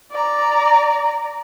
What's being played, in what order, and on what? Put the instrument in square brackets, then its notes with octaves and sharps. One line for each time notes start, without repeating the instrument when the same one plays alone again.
[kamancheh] D5 A#5